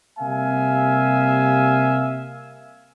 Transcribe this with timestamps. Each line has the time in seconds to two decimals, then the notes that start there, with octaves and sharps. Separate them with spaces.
0.19 C3 G3 A#3 E5 F5 G#5